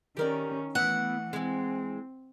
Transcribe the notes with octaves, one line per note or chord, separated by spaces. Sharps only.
D#3 C#4 G4 A#4 D5
E3 A3 B3 E4 F#5
E3 G#3 C4